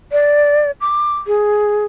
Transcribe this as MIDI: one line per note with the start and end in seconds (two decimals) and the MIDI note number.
0.12 0.71 74
0.81 1.17 86
1.27 1.85 68